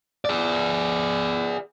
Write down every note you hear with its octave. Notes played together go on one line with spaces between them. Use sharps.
G#4 D5